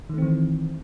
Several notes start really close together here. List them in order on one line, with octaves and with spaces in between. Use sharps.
D#3 A3 C4 E3